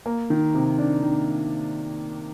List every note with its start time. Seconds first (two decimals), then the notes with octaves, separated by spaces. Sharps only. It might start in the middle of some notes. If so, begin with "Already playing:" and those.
0.06 A#3
0.30 D#3
0.54 C3
0.78 D4
1.03 D#3